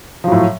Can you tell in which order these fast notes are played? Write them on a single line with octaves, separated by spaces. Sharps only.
F3 F#3 A2